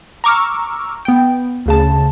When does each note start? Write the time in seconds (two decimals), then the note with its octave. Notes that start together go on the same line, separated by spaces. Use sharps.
0.24 A#5 C#6 D6 E6 F6
1.05 B3 G5
1.66 D2 C#3 A5